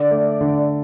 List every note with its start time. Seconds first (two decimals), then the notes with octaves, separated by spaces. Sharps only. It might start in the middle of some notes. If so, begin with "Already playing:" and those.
Already playing: D3 D5
0.11 A3
0.41 D3